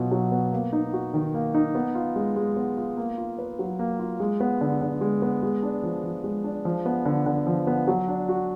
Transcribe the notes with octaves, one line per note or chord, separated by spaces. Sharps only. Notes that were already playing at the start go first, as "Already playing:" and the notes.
Already playing: B2 F#3 B3 F4
F#3
B3
A#3
D#4
F#4
D#3
A#3
D#4
B3
F4
G#3
G#3
B3
F4
A#3
F4
B4
F#3
A#3
F4
G#3
B3
D3
D3
G#3
B3
G#3
D4
F3
F3
G#3
D4
F3
B3
D3
D3
F3
B3
F#3
D4
F#4